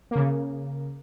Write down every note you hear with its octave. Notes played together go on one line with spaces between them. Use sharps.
C#3 A#3